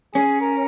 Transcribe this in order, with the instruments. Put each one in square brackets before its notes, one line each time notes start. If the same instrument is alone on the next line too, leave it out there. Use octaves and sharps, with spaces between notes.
[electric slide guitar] C#4 [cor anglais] G#4
[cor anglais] A#4